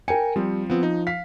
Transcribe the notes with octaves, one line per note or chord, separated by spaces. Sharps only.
A#4 G5 G#5 C#7
F3 G3 C4
F3 B3 C4
D#4
F5 B6